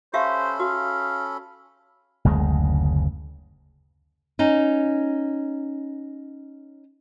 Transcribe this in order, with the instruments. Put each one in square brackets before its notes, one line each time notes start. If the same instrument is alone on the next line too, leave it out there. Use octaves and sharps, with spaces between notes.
[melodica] C#4 A4 B5 [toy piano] G4 E5 F5 [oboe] C5
[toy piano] F#4 [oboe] F5
[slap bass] F#1 D2 C#3 G#3
[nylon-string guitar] C#4 D#4